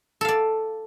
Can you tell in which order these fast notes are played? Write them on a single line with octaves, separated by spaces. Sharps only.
A4 F5 D5